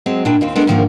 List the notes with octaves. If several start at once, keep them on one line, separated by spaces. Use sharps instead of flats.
F#3 G#3 C4
A#2 D4 E4 G5
D#2 F3 C4
G#3 B3 D4 A4 A#4
G#2 D3 D#3 F3 A#3